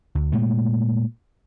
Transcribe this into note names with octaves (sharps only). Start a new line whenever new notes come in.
D2
A#2 G#3 A3